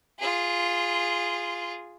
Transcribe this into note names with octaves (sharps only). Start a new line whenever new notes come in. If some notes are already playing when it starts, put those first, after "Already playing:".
F4 G#4